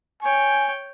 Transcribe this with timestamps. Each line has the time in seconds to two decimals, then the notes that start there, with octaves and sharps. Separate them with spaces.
0.23 C#5 G5 G#5